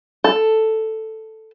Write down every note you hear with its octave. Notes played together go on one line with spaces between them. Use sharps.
A4